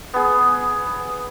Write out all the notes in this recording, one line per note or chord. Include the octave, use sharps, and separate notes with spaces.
B3 G#4